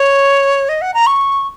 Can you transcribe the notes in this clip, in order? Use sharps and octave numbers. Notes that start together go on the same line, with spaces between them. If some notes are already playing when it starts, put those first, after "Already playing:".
Already playing: C#5
D#5
F#5
A#5
C#6